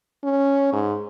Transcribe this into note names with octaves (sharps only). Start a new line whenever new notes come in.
C#4
G#2